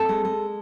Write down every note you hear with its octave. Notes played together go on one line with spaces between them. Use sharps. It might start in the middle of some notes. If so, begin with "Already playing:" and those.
Already playing: C4 A4
G#3
G#3